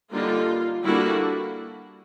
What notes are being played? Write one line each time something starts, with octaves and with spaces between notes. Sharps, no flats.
D3 G3 A#3 D#4 F4
D3 G3 A#3 D4 E4 F#4